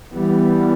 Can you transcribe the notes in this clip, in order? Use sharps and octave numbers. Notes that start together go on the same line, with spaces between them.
E3 G3 B3